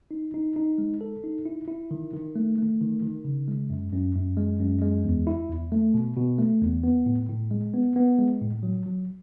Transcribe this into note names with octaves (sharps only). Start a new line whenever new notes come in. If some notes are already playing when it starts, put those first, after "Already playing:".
D#4
D#4
D#4
G#3
A4
D#4
E4
E4
D#3
D#3
A3
A3
D#3
D#3
C#3
G#3
F#2
F#2
F#2
G#3
F#2
G#3
E2
E4
E2
A3
B2
B2
A3
E2
B3
A2
A2
G#3
B3
B3
G#3
A2
F#3
F#3